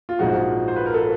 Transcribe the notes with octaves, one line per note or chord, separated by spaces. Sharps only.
F4
A#1 G#2 F3 G#3 F#4
C5
B4
A#4
A4